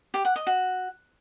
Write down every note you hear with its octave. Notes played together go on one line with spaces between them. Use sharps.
G4
F#5
D#5
F#4